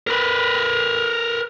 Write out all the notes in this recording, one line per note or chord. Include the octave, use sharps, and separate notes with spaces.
A#4 B4